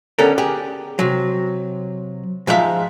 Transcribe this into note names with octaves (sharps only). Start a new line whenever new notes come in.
D3 B3 C#4 G4 A4 A#4
G4 G#4
C3 F#3
G#2 F3 G#3 F4 E5 F5